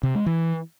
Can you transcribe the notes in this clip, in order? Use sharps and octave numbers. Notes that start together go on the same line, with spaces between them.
C3
G#3
E3